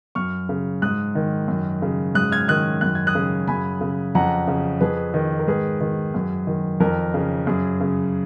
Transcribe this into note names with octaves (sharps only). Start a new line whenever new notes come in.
F#2 C#6 F6
C#3
G#2 D#6 F#6
D#3
F#2
C#3
G#2 D#6 F#6
F6 G#6
D#3 D#6 F#6
F#2 F#6
G#6
D#6 F#6
C#3
F#2 G#5 B5
C#3
F2 F#5 A#5
C#3
F2 G#4 B4
D#3
A#4
G#2 G#4 B4
D#3
F#2
D#3
F2 A#4
C#3
F#2 G#4
C#3